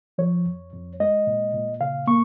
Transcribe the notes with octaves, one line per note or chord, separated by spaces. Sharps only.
F3 C#5
F2
F2
G#3 D#5
A#2
A#2
C#3 F5
A#3 C#6